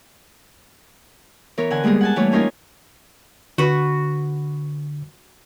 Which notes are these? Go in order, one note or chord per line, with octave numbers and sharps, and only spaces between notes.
E3 B3 A#4 C#5
D3 F#5 G#5
G3 G#3 A#3 B3 G#4
F#5 G#5 A5
E3 G3 A3 C#5
A#3 C#4 D#4 F4 A#4 G#5
D3 F#4 B4